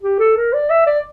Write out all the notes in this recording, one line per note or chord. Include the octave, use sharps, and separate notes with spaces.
G4
A4
A#4
D5
E5
D5